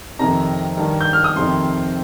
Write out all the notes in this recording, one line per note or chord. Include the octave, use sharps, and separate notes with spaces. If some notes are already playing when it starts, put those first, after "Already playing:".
F2 C3 D#3 A#5
G2 D#3
G6
F6
D#6
F2 C3 D#3 C6